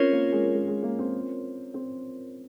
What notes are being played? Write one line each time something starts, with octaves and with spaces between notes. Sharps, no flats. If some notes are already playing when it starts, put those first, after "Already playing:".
Already playing: C4 C#4 F4 A#4 C#5
A#3
G#3
G#3
G#3
A#3
C4
C4